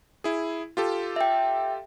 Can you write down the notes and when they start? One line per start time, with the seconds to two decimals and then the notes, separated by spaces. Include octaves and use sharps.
0.24 E4 G#4
0.77 F4 G4 A4
1.16 E5 G5